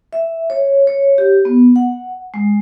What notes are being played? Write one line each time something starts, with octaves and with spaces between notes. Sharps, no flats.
E5
C#5
C#5
G4
B3
F#5
G#3